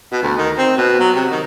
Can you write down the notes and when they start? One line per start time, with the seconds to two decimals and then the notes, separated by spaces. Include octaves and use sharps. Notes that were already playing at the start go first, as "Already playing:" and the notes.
0.12 B2
0.23 D2
0.38 D#3
0.58 C4
0.78 B2
1.00 F#3
1.15 C3
1.31 D#3